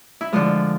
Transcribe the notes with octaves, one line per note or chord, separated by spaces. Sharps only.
E4
D3 F3 G#3 F4